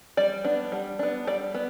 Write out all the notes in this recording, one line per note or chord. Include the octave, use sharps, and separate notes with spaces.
G3 D5
B3 D4
G3
B3 D4
G3 D5
B3